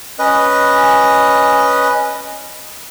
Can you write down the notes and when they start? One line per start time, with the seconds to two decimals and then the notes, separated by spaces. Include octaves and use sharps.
0.19 C#4 B4 D#5